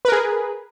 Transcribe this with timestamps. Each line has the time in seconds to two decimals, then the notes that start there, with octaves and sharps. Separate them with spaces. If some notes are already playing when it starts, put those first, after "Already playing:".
0.05 B4
0.08 A#4
0.12 G#4